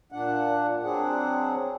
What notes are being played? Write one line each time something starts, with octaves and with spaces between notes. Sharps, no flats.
A#2 D4 F#5
F#3 C4 D4 G#4 F#5